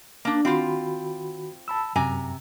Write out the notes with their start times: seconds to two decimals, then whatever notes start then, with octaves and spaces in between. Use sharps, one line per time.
0.25 A#3 D4
0.45 D#3 C4 F4 F#4 B5
1.68 A5 B5 E6
1.96 F#2 C3 G#5 A#5